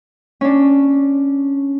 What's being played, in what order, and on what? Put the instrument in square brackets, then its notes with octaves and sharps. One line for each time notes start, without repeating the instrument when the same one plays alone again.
[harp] C#4 D4